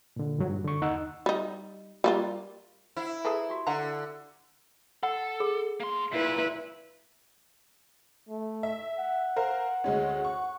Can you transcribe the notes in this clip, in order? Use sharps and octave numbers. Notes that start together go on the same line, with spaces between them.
A#2 D3
G2 D#3 F3 F#3
G2
D3 C#6
D#2 D#4 F#5 E6
G3 D#4
G3 A#3 F4
E4 C5 F#5
G#4 A4 B4 E5 A5 A#5
F#4 G4 D5
D3 F5 F#5 A#5
A4 F#5
G#4
A#3 C6
A#2 E4 B4
A3
E5
F#5
A#4 C5 F5
D2 G#3 C#4
C#6